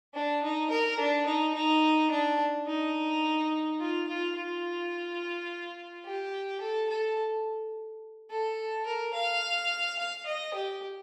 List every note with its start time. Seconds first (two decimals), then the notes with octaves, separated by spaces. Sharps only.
0.14 D4
0.43 D#4
0.70 A#4
0.99 D4
1.26 D#4
1.55 D#4
2.11 D4
2.67 D#4
3.80 F4
4.08 F4
4.36 F4
6.05 G4
6.61 A4
6.90 A4
8.30 A4
8.87 A#4
9.14 F5
9.99 F5
10.26 D#5
10.54 G4